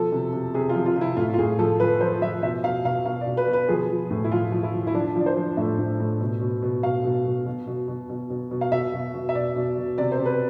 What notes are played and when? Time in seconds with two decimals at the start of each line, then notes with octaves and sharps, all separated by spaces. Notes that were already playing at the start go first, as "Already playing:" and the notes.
Already playing: B2 F3 A4
0.12 C3
0.33 C3
0.54 C3 G#4
0.69 F4
0.75 F3
0.86 F4
0.96 C3 E4
1.17 A2 F4
1.34 F4
1.38 A2 G#4
1.59 F3 A4
1.80 F3 B4
2.01 F3 C5
2.22 F3 E5
2.43 B2 E5
2.64 B2 F5
2.85 B2 F5
3.06 B2 F5
3.21 D5
3.27 B2
3.37 B4
3.48 B2
3.53 B4
3.69 F3 G#4
3.90 F3
4.10 A2
4.24 E4
4.31 F3 F4
4.52 F3
4.63 E4
4.74 F3
4.87 E4
4.95 F3 D4
5.16 F3 D5
5.26 C5
5.36 F3
5.57 A2 E5
5.79 A2
6.00 A2
6.21 B2
6.41 B2
6.62 B2
6.83 B2 F5
7.04 B2
7.25 B2
7.46 B2
7.67 B2
7.88 B2
8.09 B2
8.30 B2
8.51 B2
8.61 F5
8.72 B2 E5
8.94 B2
9.14 B2
9.29 E5
9.35 B2 D5
9.56 B2
9.77 B2
9.98 C3 D5
10.12 C5
10.19 C3
10.25 B4